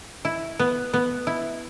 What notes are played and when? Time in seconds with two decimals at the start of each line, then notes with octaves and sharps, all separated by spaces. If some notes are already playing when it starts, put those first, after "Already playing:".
0.25 E4
0.59 B3
0.94 B3
1.27 E4